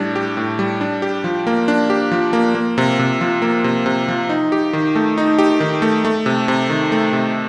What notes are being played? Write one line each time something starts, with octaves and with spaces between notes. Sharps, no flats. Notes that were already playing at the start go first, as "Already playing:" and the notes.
Already playing: A2 G3 D4
G4
A2
G3
D4
G4
F3
A#3
D4
G4
F3
A#3
A#3
C3
C3
F3
A#3
C3
C3
F3
D#4
G4
D#3
A3
D#4
G4
D#3
A3
A3
C3
C3
D#3
A3
C3